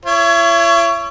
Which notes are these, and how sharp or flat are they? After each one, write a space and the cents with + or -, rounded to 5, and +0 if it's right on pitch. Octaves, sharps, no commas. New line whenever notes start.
E4 +40 C#5 +10